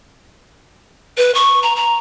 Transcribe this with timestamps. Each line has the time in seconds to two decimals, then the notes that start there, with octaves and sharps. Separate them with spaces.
1.17 B4
1.35 C#6
1.63 A#5
1.76 A#5